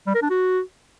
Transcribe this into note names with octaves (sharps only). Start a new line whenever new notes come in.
G3
A#4
D4
F#4